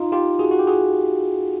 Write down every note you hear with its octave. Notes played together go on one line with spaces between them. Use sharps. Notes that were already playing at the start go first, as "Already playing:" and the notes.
Already playing: D#4 F4
F4 G4
F#4 G#4
F#4
G4
F#4 G#4